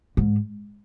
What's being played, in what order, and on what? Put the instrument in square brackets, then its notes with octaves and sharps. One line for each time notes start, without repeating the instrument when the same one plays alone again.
[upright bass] G#2